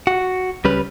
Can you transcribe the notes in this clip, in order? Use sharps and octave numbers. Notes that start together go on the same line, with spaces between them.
F#4
C#2 G3 C#4 B4